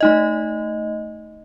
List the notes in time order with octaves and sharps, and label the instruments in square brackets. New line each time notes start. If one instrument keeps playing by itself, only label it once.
[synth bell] A3 D#4 D#5